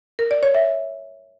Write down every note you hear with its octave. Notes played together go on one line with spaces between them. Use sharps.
A#4
D5
C#5
E5